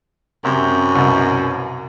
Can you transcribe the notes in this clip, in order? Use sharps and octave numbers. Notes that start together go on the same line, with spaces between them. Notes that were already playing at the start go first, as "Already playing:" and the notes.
F#2 C3
C2 B2